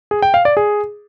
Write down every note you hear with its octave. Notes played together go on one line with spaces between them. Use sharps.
G#4
G5
F5
D5
G#4